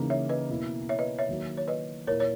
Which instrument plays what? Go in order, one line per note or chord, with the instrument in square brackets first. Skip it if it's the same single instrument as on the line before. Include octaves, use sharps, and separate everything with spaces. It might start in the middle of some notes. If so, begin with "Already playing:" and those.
Already playing: [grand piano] C#3 E3 A#3 D#4
[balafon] C#5 E5
B4 D#5
[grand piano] B2 A#3 E4
[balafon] C#5 E5
B4 D#5
C#5 E5
[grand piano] D#3 F#3 A#3
[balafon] C#5
B4 D#5
[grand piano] A#2 A#3 E4 [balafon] A#4 C#5
[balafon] C#5